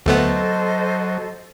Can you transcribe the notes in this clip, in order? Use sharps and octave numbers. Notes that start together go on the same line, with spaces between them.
D2 F#3 A3 B3 A4 C5 D#5